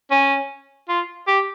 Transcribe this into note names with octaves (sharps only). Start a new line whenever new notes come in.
C#4
F4
G4